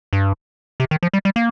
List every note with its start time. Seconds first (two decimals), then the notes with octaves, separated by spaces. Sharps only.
0.13 G2
0.80 C3
0.91 D#3
1.03 F3
1.13 G3
1.25 G3
1.36 A#3